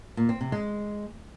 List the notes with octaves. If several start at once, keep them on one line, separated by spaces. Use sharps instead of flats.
A#2
C4
C3
G#3